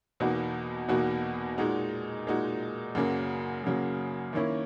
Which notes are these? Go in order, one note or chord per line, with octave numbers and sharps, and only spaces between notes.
E2 B2 A#3 D#4 F#4
E2 B2 A#3 D#4 F#4
A#2 G#3 D#4 F#4
A#2 G#3 D#4 F#4
F#2 C#3 F#3 A#3
F#2 C#3 F#3 A#3
D#3 A#3 C#4 E4